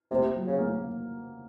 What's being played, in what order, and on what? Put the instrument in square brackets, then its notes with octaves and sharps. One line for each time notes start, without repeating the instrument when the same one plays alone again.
[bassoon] C3 [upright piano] A#3
[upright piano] F#3
[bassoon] C#3
[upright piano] A#3